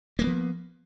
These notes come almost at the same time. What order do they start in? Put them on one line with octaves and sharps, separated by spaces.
A#3 G#3 B3 F3